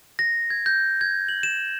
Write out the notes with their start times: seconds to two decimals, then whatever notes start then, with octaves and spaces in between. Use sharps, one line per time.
0.19 A#6
0.50 G#6
0.66 G6
1.01 G#6
1.29 F#7
1.43 E7